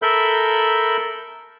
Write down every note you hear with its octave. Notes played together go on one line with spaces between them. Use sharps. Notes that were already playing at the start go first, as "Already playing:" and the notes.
A4 A#4 E5 B5 G6